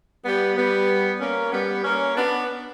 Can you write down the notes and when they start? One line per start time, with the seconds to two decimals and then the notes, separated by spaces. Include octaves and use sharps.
0.25 G3 B3
0.57 G3 B3
1.21 A#3 C#4
1.53 G3 B3
1.84 A#3 C#4
2.16 B3 D4